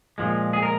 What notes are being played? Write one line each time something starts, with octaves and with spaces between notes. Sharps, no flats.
A#2 F3 G#3
G#4
A#4